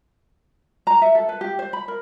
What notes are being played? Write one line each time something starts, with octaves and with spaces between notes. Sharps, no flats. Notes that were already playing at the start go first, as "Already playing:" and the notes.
A#5
E5
A4
B4
G4
C5
B5
A#4